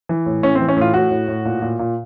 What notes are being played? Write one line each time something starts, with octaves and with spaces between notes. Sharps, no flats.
E3
A2
A2 C#4
C4
E3
C#4
A2 F4
A2 F#4
A2
A2
A#2
A#2
A#2